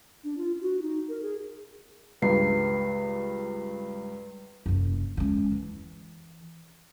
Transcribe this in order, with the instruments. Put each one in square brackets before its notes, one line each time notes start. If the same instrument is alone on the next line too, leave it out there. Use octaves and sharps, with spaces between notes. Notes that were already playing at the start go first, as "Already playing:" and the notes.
[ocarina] D4
F4
F#4
D#4
A#4
G#4
[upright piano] C#2 G2 [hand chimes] B4 C7
[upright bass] F#1 C3
G#3 C#4
E3